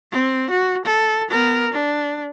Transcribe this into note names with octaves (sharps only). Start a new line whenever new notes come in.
C4
F#4
A4
B3 A#4
D4